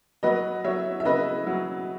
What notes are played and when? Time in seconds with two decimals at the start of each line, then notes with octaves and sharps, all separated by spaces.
0.23 F#3 B4 D#5
0.64 F#3 C#5 E5
1.00 E5
1.05 C#3 B4 D#5
1.47 F#3